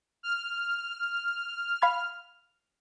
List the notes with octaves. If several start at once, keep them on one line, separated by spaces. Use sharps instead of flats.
F6
F5 B5 G#6